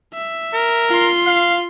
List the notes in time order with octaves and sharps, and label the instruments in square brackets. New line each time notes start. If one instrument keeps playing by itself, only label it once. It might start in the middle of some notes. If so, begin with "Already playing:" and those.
[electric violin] E5
[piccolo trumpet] A#4
[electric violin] F4 C6
[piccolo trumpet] F5